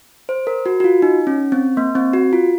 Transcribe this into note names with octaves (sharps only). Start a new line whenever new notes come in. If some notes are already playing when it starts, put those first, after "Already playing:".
C5
A#4
F#4
F#4
F4
D#4
C#4
C4
A#3
C4
F#4
F4